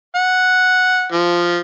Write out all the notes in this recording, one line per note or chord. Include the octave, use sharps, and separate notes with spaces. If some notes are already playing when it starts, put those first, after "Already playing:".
F#5
F3